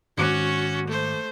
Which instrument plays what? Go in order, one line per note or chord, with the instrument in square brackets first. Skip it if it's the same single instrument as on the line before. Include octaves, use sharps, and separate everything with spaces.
[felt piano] G#1 D6 F#6 [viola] C#4 F#4
[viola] A3 C5